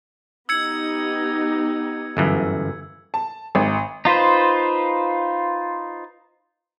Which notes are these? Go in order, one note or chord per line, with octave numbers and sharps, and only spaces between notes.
B3 D#4 G4 E6 G#6 C#7
G1 F#2 E3
A5
G#1
D#4 F4 B4 C5